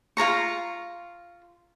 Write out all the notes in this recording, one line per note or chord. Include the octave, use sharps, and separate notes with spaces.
F4 A#4 A#5 C#6